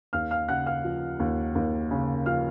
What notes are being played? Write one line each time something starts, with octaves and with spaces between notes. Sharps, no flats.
D#2 F5 F6
F5 F6
C#3 F#5 F#6
F5 F6
F3
D#2
D#2
C#3
F3 F5 F6